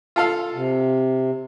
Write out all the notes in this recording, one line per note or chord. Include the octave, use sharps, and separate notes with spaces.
F4 A4 F5
C3